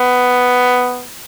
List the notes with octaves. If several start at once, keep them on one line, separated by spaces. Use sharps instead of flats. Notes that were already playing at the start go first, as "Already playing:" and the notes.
Already playing: B3